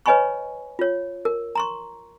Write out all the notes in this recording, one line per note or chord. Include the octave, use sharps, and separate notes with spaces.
B4 C#5 D#5 G#5 B5 C#6
F4 C#5
A#4
A#5 C6 C#6